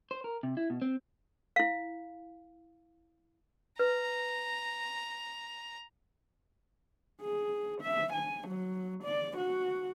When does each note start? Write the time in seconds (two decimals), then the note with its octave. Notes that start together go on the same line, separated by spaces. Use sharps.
0.11 C5
0.24 A#4
0.43 C3
0.57 E4
0.70 B2
0.82 C4
1.56 E4 F5
3.79 B4 A#5
7.21 G#4
7.81 E5
8.13 G#5
8.48 F#3
9.04 D5
9.38 F#4